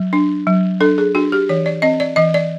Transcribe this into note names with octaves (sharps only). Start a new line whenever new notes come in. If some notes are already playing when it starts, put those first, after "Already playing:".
Already playing: F#3
D4
F#3
D4 A4
G#4
D4 F#4
G4
E3 C#5
D5
C4 D#5
D5
E3 D#5
D5